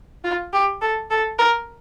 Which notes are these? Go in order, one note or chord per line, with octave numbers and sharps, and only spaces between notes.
F4
G4
A4
A4
A#4